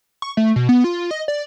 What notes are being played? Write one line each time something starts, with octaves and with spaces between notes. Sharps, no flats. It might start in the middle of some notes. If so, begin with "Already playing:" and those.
C#6
A3
B2
B3
F4
D#5
D5